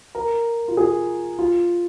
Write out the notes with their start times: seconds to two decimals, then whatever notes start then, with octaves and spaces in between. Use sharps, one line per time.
0.15 A#4
0.68 F4
0.77 G#4
1.39 F4